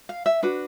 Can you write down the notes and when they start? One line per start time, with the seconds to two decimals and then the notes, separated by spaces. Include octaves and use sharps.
0.09 F5
0.26 E5
0.43 D4 F#4 B4